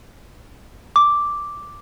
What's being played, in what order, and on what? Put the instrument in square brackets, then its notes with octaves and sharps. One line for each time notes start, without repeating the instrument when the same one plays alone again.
[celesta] D6